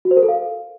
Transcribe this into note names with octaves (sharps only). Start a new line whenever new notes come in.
F#4
C5
A#4
A4
F5